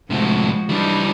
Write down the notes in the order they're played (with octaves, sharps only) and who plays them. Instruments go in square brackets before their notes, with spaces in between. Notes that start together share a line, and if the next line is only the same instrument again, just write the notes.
[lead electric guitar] A2 C3 [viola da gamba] F3 G#3 F#4
[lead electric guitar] E3 G3 [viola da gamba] D4 D#4